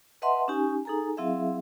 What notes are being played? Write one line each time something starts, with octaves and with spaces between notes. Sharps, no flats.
B4 D#5 E5 F#5 A5 C6
C#4 D#4 G4 G#5
D#4 G#4 A4 G#5 A#5
F#3 C4 E4 G#4 E5 F5